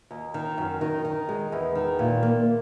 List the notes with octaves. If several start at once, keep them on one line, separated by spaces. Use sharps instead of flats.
D#2
D#3
F#2
D#3
D#3
G#3
E2
D#3
A#2
A#3